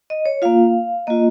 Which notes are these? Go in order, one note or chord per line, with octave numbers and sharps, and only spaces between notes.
D#5
C#5
A#3 F4 F5
A#3 F4 D#5